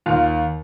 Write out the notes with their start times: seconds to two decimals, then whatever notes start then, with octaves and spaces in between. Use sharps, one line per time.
0.06 D#2 F4